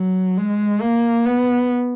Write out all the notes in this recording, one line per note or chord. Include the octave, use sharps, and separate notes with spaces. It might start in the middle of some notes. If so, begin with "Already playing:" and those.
Already playing: F#3
G#3
A#3
B3